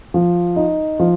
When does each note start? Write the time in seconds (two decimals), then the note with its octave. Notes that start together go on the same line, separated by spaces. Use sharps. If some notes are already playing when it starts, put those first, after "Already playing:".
0.14 F3
0.56 D#4
1.00 F3